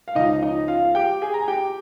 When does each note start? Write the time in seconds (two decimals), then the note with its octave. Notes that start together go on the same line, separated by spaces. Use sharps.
0.08 F5
0.15 C#2 C#3 F3 D#4 D#5
0.42 D#4 D#5
0.68 F4 F5
0.85 F5
0.95 G4 G5
1.22 G#4 G#5
1.34 A#5
1.41 G#5
1.48 G4 G5